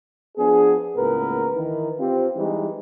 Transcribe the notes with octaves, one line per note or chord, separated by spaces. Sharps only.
F3 B3 D4 G#4
C#2 A2 A#3 B3 A#4 B4
D#3 E3 B4
C4 F4 G4
E3 G3 G#3 D#4